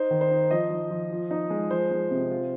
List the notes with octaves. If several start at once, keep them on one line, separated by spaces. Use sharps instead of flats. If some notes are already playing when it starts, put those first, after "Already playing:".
Already playing: D#4 C5
D#3
C5
D#4
F3 D#5
F3
F3
F3
D#4
G#3
F3 C5
G#3
C3
F4